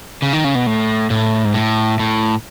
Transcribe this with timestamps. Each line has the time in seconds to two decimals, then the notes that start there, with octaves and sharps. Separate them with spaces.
0.22 C#3
0.33 D#3
0.44 C#3
0.55 B2
0.67 A2
1.10 A2
1.45 G#2
1.54 A2
1.99 A2